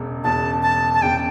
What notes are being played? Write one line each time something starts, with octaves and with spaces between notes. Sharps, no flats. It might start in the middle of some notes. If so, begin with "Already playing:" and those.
Already playing: E1 E2 C#3
E1 E2 C#3 A5
A5
A5
E1 E2 C#3 G5